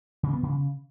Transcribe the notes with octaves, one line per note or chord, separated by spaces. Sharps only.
C#3
B3
C#3